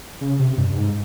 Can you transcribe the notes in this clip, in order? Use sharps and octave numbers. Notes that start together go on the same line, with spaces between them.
C#3
C3
G2
G2
G#2